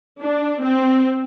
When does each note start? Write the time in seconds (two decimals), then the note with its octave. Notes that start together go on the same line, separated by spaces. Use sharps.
0.23 D4
0.64 C4